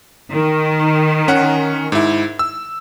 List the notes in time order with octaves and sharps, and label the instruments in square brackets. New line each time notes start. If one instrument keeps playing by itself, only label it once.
[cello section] D#3
[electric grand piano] C#4 F#5
G#2 E4
E6